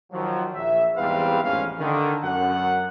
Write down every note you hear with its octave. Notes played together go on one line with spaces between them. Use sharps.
D#3 F3 F#3
A#1 E5
E2 G#2 G3 C4 B4 F5
A1 F2 G#2 C#4 F5
D3 D#3
F#2 F#5